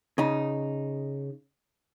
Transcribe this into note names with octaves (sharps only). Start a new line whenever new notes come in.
C#3 D#4